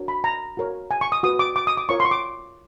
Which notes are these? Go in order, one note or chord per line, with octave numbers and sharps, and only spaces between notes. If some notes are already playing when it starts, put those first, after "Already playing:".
Already playing: D4 F#4 A#4 C#5
B5
A#5
F#4 A#4 C#5
G#5
C#6
D#6
F#4 B4 D#6
D6
D6
D#6
D6
F4 A#4 C#5 C#6
C6
C#6
D6